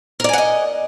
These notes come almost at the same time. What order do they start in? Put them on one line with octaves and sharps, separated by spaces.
A#4 D5 G#5 F#5 D#5